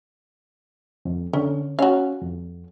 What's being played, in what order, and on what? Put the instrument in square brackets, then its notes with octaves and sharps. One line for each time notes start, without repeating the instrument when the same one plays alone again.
[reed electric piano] F2
[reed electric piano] D3 [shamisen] C#4
[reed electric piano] C#4 [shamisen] F#4 F5
[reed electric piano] F2